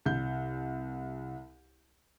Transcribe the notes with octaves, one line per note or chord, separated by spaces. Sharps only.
C2 G6